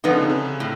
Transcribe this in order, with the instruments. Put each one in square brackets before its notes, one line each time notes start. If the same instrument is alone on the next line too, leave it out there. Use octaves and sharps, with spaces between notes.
[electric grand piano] D3 [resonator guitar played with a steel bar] F3 G#3 B3 D#4
[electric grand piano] C#3
C3
C#3
[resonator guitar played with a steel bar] A2